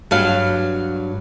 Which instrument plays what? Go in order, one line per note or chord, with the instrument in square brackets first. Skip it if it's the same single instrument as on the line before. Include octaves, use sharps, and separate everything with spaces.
[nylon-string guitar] G2 F#3 F5